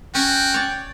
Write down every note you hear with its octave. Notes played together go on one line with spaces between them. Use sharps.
C#4 F#4 G5
C#5 D5